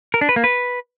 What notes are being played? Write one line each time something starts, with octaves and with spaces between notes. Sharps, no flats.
A#4
D4
B4
A#3
B4